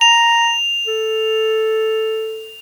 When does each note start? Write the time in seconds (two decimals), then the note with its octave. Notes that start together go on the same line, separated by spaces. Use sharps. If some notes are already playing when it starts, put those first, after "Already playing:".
0.01 A#5 F7
0.87 A4